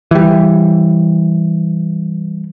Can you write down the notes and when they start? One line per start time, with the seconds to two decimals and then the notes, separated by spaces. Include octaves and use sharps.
0.11 E3 G3